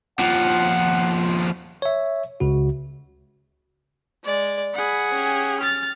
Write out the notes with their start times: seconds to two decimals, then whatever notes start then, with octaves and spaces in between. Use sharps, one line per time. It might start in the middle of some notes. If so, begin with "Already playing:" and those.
0.19 D#2 F3 F#5
1.82 C#5 E5
2.40 C#2 C#3 F#4
4.24 G#3 D5
4.74 G#4 F#5 B5
5.11 C#4 G4
5.61 F6 A6